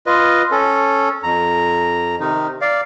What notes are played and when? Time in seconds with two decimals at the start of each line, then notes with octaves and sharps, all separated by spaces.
0.06 F4 B4 D#5
0.51 C#4 A4
1.23 F2 A#5
2.20 C3 D#3 D#4
2.61 D5 F5